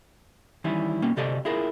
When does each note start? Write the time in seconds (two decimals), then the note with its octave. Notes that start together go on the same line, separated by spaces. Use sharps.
0.64 D#3 E3 G3 C#4 E4
1.02 B2 A#3 C#4
1.16 D2 C3 G4 A4 D5 D#5
1.45 E4 F4 G#4 A#4